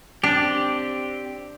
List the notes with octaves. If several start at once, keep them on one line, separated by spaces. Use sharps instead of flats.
C4 D4 G4